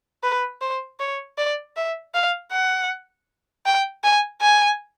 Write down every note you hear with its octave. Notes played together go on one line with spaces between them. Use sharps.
B4
C5
C#5
D5
E5
F5
F#5
G5
G#5
G#5